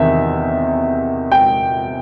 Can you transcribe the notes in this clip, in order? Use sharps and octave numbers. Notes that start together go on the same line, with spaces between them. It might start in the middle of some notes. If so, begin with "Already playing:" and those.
Already playing: E2 C3 D#3 E5
G5